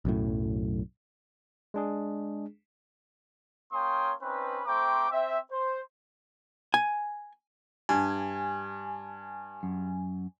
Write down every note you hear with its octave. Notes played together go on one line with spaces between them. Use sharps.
B1 F#2 A2
G#3 D4 G#4
A#3 C#4 C#5 G5 C6 D#6
C4 C#4 D#4 B4
A3 C4 C5 G5 A#5 D6
C4 E5
C5
G#5
G2 G#5
F#2